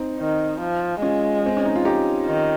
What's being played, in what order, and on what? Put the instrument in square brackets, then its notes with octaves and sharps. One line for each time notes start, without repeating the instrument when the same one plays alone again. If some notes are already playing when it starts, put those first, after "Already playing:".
Already playing: [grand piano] C4 D#4
[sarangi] D#3
F3
[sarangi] G#3 [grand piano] C#4 F4
[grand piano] C4
C#4
D#4
F4
D#4 G4
[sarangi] D#3